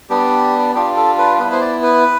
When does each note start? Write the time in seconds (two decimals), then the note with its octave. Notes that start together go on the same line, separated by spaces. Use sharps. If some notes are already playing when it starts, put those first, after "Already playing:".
0.10 G3 B3 D4 G4
0.75 G3 D4 F4 G4
0.96 A4
1.18 B4
1.39 B3 E4 B4
1.52 C5
1.61 D5
1.83 B4